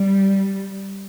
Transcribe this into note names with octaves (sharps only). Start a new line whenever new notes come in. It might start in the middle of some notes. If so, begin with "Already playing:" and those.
Already playing: G3